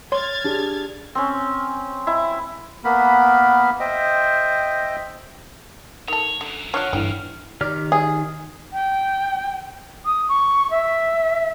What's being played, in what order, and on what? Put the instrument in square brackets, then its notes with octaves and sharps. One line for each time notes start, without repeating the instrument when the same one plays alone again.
[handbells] C#5 C6 [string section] F6 G#6 A6
[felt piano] D4 G4 G#4
[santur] C4 C#4
E4
[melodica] A#3 B3 A#4 B5
C5 D#5 E5 G5
[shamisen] D#3 A4 [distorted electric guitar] C#5
[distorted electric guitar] F#2 E3 [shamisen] D3
[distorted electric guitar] D3 [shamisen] D4 F4 [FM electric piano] C#5 F#5 [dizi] F6
[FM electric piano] G1 D3 E3 [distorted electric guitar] A2 [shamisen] G5
[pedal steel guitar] D#3 G4 F6 [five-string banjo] D5
[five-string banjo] G#4
[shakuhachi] G5
D#6
C#6
E5